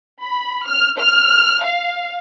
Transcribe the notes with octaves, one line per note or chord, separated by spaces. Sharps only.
B5
F6
F6
F5